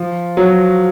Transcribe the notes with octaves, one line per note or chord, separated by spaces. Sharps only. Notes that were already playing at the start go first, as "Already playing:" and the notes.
Already playing: F3
F#3